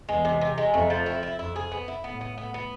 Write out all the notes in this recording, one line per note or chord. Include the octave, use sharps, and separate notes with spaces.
E2 G#3
C3
C3
G#3
F2 A3
F3
E4
E4
F2 E4
G#4
B3
E4
A2 B3
B3
B3
B3